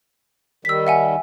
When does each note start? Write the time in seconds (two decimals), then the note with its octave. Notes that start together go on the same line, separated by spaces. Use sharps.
0.65 D#3 G3 E6 B6
0.87 E5 F#5 G#5